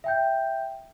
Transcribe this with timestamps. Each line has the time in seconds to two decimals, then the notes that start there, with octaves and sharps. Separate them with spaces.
0.04 E5 G5 G6